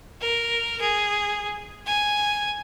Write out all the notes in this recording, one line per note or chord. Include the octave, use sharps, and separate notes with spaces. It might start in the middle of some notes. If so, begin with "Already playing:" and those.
A#4
G#4
G#5